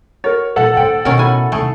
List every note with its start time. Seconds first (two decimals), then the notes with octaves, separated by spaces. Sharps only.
0.24 F#4 A#4 C#5
0.56 A#2 F3 A4 F#5
0.77 A2 D3 C5 G5
1.05 B2 D#3 C#4 A#4
1.18 A2 E4 G#5 B5
1.52 D#2 C3 A3 G#4